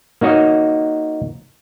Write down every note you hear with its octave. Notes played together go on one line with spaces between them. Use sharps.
A#3 D#4 F#4 C#5 D#5